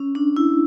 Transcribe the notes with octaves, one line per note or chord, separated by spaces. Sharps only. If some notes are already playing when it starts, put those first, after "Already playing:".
Already playing: C#4
D4
E4